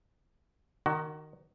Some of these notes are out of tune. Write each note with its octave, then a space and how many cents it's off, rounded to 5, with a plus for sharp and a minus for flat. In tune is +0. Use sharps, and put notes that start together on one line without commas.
D#3 -15 F#4 +25